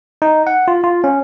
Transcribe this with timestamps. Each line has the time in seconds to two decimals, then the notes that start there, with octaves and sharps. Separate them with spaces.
0.22 D#4
0.47 F#5
0.68 F4
0.84 F4
1.04 C#4